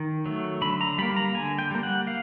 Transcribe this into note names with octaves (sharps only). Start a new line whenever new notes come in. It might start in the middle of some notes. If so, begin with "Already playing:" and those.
Already playing: D#3
F#3 A3
D3 B5
A#5
G3 A#3 B5
A#5
D3 G#5
G5
G3 A#3
F#5
F5